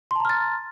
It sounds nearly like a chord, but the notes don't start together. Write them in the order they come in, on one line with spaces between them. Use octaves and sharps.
C6 A5 A#5 F6 A6